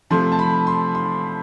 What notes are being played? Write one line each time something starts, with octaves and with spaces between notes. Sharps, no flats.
C3 F3 A3 C6
A5
B5
C6
C6